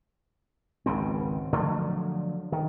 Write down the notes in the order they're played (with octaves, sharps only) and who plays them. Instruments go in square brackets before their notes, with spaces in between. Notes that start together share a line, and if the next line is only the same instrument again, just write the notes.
[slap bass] G#1 C#2 C#3 C4
D3 F3 F#3 A3
D#3